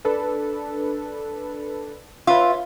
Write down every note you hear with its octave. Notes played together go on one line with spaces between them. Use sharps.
D4 A4 B4
F4 B4 C#5 E5